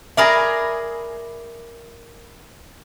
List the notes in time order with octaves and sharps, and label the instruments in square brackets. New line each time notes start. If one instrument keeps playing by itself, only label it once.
[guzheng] G#4 A#4 D5 [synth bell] E5 B5 A#6